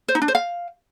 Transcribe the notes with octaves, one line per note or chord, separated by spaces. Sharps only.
C5
D#4
D4
C5
F5